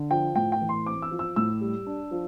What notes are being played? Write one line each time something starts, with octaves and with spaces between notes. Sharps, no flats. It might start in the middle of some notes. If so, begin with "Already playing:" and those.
Already playing: D3
F3 G5
A2 G5
G5
E3
C6
C4 D6
E6
F3
E6
A2 E6
G3
D4
F3